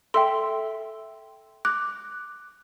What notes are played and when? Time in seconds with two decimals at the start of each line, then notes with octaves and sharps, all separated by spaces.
0.14 A4 E5 G5 C6 E6
1.65 D6 F#6